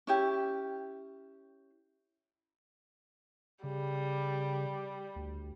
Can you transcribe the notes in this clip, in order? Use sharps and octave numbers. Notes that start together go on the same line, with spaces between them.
C#4 E4 G4
C#3 G3
D2